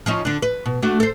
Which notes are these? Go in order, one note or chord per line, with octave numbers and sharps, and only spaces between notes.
F3 C#4 D#4
D3 D4
B4
B2
A3 D4 F#4
A4 C5